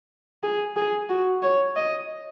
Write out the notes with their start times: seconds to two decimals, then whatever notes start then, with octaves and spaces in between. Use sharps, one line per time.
0.43 G#4
0.76 G#4
1.09 F#4
1.43 C#5
1.76 D#5